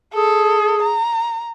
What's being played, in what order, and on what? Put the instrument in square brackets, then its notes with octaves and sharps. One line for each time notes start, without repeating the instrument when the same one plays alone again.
[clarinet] G#4 [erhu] A4
[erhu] A#5